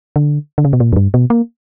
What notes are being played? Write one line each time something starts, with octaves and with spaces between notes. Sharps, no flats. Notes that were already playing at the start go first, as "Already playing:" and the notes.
D3
D3
C#3
B2
A#2
F#2
G2
B2
A#3